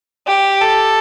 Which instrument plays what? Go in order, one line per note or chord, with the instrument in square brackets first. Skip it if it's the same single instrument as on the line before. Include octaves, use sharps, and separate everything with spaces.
[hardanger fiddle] G4
A4